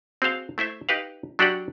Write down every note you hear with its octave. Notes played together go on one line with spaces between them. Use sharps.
C4 F#4 G#4 C5 F5
A3 E4 C5 E5
D#4 G4 B4 F5
F#3 D4 F#4 G4 D5 F#5